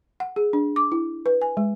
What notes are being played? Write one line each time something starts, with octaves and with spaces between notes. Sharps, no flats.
F#5
G#4
D4
D6
E4
B4
G#5
G#3